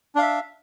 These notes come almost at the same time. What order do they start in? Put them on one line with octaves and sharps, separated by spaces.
D4 F5 E5